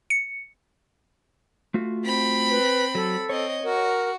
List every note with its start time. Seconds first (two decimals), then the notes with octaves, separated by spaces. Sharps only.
0.10 C#7
1.74 A3 F4 F#4
2.05 C4 B5
2.50 B4
2.95 F#3 A4
3.29 C4 C#5 D#5
3.64 F#4 A#4